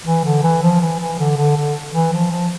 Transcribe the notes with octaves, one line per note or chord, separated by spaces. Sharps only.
E3
D3
E3
F3
E3
E3
D3
D3
D3
E3
F3
F3